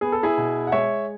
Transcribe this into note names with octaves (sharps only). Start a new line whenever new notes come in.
B3 G#4
A4
E4 G#4
B2
F#5
G#3 C#5 E5